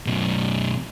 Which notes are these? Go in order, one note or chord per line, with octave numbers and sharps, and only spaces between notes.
F#2 B2